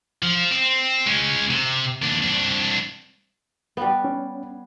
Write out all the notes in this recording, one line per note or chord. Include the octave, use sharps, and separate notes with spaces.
F3
C4
G#3 C#4
C3
D#2 D4
C2 D4
G3 B3
C#4